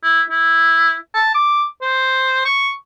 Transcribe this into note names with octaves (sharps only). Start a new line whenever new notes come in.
E4
E4
A5
D6
C5
C#6